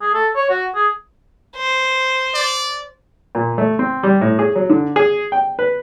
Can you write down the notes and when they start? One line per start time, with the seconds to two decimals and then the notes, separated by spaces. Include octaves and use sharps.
0.02 G#4
0.14 A4
0.36 C#5
0.50 F#4
0.75 G#4
1.57 C5
2.34 D5
3.35 A#2
3.58 A3
3.79 C4
4.03 G3
4.21 A2
4.39 G#4
4.55 F#3
4.70 D3
4.96 G#4
5.32 G5
5.59 B4